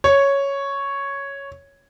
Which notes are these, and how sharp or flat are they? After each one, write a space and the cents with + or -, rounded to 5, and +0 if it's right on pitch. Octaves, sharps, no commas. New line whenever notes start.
C#5 +0